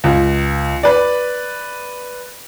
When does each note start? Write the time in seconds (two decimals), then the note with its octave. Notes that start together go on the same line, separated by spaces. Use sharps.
0.04 C#2
0.83 B4 D5